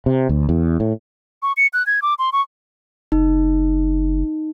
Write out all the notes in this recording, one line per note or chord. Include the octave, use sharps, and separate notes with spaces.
C3
D2
E2
A2
C#6
C#7
F#6
G#6
D6
C6
C#6
F#1 D#4